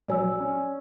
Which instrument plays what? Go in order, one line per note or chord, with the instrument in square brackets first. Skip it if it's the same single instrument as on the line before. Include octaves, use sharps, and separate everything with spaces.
[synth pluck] A#1 F#3 [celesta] D5 G#5 E6
[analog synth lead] C#4